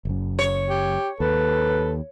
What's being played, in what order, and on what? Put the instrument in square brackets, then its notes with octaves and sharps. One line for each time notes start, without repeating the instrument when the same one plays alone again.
[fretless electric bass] F#1 F#2
[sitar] C#5
[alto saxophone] G4
[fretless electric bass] D#2 [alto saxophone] A4 [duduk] B4